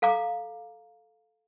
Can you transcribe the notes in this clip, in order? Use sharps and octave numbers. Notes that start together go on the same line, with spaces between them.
A4 F5 A#5 D6